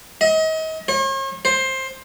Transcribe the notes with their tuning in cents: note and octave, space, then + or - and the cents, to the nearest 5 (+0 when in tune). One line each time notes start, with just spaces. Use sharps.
D#5 +35
C#5 -45
C5 +15